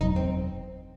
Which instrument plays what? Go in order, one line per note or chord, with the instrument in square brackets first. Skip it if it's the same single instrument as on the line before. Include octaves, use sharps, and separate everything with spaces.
[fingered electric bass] F#1 E2 B2 F#3 [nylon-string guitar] D#4
[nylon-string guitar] C4